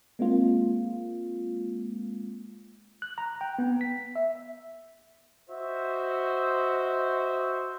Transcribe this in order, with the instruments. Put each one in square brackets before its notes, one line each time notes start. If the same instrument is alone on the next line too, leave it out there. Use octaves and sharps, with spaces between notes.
[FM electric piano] G#3 A#3 C4 F4
[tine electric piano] F#6
A#5
G5
B3
B6
E5
[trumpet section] F#4 C5 D#5 E5